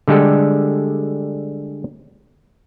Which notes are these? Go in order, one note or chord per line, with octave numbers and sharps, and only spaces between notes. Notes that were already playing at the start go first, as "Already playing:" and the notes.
D3 G3 G#3 G4 A4